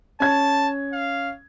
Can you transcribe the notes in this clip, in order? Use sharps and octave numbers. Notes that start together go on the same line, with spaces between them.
C#4 A5 G#6
F5